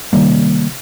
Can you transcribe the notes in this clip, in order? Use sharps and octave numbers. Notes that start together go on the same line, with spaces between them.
C3 D#3 G3 A#3